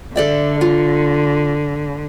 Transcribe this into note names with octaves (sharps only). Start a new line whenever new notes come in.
D3 A4 D5 E5
F4